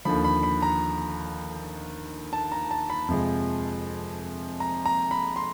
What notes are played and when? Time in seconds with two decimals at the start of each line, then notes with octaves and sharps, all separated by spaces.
0.05 D#2 D3 F3 B5
0.24 B5
0.43 B5
0.62 A#5
2.33 A5
2.52 A#5
2.71 A5
2.90 B5
3.08 F2 C3 F3 G#3
4.60 A#5
4.86 A#5
5.11 B5
5.36 C6